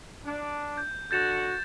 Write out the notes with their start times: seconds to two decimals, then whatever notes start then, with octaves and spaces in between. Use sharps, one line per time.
0.24 D4
0.77 G6
1.11 D3 F#4 G6 A6 E7